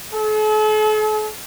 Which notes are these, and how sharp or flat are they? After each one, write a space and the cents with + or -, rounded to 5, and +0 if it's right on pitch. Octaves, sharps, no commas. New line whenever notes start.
A4 -45